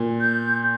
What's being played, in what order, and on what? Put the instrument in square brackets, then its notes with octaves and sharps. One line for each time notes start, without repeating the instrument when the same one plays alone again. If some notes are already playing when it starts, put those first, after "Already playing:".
Already playing: [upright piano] A#2
[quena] G6